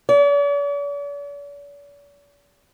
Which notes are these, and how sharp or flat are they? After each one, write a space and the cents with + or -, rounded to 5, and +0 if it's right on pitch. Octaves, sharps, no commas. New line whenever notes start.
D5 -45